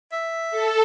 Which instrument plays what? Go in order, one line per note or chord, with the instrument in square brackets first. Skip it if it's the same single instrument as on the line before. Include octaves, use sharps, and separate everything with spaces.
[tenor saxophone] E5
[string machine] A4